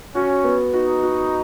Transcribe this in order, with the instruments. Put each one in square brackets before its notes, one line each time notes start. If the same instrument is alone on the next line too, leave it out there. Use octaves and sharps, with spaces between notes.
[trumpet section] C#4 [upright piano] F#4
[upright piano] B3
[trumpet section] D#4 [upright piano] F#4
[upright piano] F#4